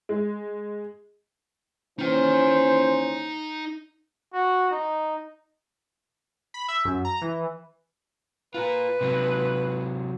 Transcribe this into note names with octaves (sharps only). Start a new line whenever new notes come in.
G#3
D#2 E3 C#4 D#4 C5 G5
F#4
D#4
B5
E5
F#2
A#5
E3
F4 A#4 B4
C3 F#3